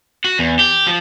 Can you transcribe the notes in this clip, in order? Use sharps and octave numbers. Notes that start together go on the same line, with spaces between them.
F#4
E2
G4
F3